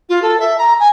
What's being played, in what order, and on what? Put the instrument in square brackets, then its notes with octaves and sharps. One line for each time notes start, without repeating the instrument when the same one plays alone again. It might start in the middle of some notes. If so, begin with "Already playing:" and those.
[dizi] F4
A4
E5
A#5
G#5